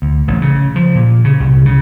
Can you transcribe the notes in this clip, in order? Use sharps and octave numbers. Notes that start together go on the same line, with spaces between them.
D2
A1
C#3
F3
A#2
C#3
C2
C#3